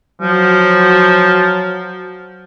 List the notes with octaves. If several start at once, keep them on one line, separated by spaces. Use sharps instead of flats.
F3 F#3